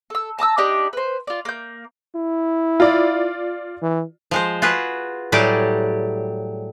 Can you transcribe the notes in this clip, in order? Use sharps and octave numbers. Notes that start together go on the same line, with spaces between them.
A4 E6
A5 A#5 D#6 E6
D4 D#4 G4 D5
B4 C5
F4 D5
A#3 G6
E4
F4 D5
E3
F3 G#3 C5
F4 F#4 G#4 B4
A2 F#3 G3 G4 G#4 D5